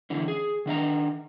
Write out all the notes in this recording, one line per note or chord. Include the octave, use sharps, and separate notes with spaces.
D3 E3 C#4
G#4
D#3 D4 D#5 A#5